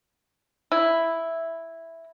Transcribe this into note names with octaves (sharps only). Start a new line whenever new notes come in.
E4